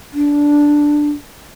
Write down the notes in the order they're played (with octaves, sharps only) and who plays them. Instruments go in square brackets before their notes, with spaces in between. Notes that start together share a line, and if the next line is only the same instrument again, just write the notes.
[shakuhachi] D4